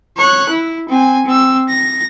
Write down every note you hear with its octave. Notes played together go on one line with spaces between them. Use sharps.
C#5 F#6
E4
C4 G#5
C4 E6
A#6